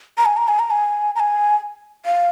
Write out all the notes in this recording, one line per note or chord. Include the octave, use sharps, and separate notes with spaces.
A#5
G#5
A#5
G#5
A#5
G#5
A#5
G#5
F5